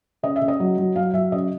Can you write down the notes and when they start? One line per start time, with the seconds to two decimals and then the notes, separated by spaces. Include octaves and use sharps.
0.23 C#3 D#5
0.36 E5
0.41 C#3
0.48 D#5
0.60 F#3
0.78 F#3
0.96 F#3 F5
1.13 F#3 E5
1.32 C#3 D#5